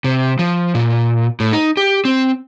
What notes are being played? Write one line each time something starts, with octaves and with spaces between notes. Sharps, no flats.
C3
F3
A#2
A2
D#4
G4
C4